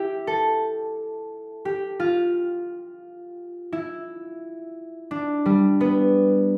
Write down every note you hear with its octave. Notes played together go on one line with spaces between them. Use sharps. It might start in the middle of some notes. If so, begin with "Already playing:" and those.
Already playing: E4 G4
A4
G4
F4
E4
D4
G3
B3